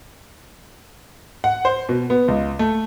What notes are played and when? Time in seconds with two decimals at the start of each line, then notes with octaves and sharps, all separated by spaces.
1.44 F#5
1.65 C5
1.89 B2
2.10 B3
2.28 C#2
2.59 A3